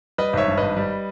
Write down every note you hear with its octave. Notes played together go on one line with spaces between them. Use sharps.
G3 B4 D#5
G#1 C#5 E5
G2
G#1 B4 D#5
G3